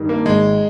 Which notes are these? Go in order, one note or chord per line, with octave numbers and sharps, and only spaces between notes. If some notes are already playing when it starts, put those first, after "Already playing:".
Already playing: G2 D#3
A#3
G#1 G#3